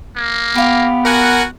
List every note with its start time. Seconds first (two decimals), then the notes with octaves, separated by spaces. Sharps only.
0.17 A#3
0.55 B3 G4 F5
1.05 F#4 A#4 F#5 G#5